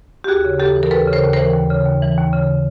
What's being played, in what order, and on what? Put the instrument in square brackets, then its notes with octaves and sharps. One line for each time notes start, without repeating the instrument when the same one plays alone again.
[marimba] G4
D#2 F#4 G#4
C#3
D#2 G4 A4
E3
A#4
D#2 A4 B4
C#3
A#4 C5
D#2
A#4 C5
E3
D#2
C#3
D#2
E3
D#2
C#3